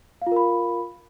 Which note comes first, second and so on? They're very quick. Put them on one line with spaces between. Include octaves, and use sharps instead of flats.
F5 F4 A#4 B5